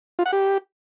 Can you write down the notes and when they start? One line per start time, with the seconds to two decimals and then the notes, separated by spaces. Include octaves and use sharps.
0.19 F4
0.26 F#5
0.33 G4